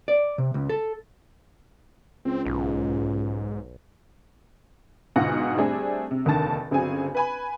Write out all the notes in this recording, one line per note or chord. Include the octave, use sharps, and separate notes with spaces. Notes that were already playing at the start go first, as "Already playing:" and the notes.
D5
C3
C#2
A4
C#2 C4
B1 G#2
D2 G#2 B2 F4 F#5 A#6
G3 A3 C4 D4 G#4
C3
F1 D#2 D3 D#3 A5 A6
G1 C#3 F#3 C4 G#4 G#5
B4 G#5 B5